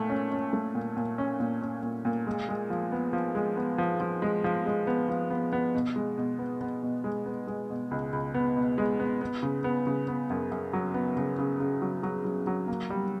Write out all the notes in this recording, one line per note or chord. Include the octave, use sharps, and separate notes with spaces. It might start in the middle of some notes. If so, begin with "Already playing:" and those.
Already playing: A#2 A3
C#4
C#4
A3
A#2
A#2
C#4
A#2
C#4
A#2
A#2
G#3
G#3
F3
B3
F3
G#3
B3
F3
F3
G#3
F3
G#3
B3
F3
B3
B3
B2
G#3
B2
B3
B3
B2
G#3
B3
G#3
B2
C#2
C#2
B3
B2
G#3
B3
B3
C#3
B3
C#3
B3
F#2
F#2
F#3
B3
C#3
C#3
C#3
F#3
F#3
F#3
F#3
A#3
G3